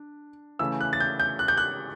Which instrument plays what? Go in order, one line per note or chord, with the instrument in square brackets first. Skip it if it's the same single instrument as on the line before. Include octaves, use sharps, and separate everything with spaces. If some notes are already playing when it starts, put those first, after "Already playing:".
Already playing: [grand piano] D4
C#3 E3 A3 C#4 E4 E6
F#6
A6
G6
G6
F#6
G6
F#6